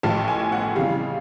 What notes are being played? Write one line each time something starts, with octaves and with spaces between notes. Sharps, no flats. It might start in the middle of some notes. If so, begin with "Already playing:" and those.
A1 A2 F3 A5
G#5
F#5
F2 C#3 E3 G3 F5